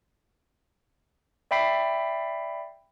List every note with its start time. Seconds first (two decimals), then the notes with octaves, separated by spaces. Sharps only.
1.51 D5 E5 G5 B5 B6 C7